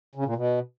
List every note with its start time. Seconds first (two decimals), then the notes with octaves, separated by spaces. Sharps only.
0.15 C#3
0.25 A#2
0.36 B2